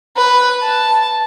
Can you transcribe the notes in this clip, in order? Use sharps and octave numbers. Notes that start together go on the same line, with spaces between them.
B4
A5